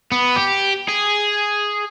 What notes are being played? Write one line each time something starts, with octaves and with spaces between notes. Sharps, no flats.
B3
G4
G#4